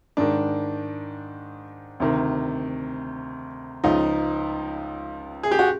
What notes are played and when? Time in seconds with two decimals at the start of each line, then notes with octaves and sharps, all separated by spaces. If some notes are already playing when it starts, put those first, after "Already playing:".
0.17 G#2 D#3 D4
2.00 D2 C3 D#3
3.84 C#2 C#3 F3 D#4
5.43 G#4
5.51 G4
5.59 F#4